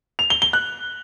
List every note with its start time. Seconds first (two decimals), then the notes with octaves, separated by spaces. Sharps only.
0.19 F7
0.30 G7
0.42 G7
0.53 F#6